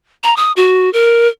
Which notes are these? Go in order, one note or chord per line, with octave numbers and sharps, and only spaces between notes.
A#5
D#6
F#4
A#4